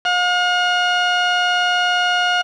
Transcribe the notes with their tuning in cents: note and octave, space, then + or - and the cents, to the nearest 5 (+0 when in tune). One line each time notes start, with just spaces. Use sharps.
F5 +45